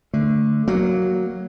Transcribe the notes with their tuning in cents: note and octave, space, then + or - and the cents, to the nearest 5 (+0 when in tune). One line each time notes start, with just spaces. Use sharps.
D3 +0 A3 +0
F#3 +0 A#3 +0